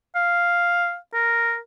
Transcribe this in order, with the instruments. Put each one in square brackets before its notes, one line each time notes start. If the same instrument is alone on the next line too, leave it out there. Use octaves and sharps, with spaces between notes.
[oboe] F5
A#4